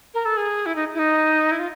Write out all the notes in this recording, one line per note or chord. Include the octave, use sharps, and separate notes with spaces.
A#4
A4
G#4
E4
D#4
E4
D#4
E4
F4